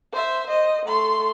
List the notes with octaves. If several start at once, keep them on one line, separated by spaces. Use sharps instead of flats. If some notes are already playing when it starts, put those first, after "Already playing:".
C5 E5
C5 D#5
A3 C6